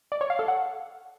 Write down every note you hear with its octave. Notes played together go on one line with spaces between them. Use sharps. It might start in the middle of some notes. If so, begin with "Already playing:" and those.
D5
C#5
F5
A4
F#5